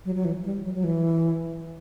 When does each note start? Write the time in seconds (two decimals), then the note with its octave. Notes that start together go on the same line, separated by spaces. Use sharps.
0.05 F#3
0.15 F#3
0.25 E3
0.44 G3
0.64 F#3
0.74 F#3
0.84 E3